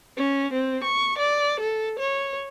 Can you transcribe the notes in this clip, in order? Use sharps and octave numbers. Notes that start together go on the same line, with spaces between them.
C#4
C4
C#6
D5
A4
C#5